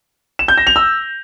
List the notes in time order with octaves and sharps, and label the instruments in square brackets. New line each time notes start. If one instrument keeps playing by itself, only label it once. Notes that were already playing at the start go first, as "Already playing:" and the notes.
[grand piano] E7
G6
A#6
F7
E6